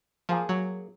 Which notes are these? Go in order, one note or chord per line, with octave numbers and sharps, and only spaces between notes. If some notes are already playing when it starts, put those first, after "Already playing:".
F3 A#3 G#4
F#3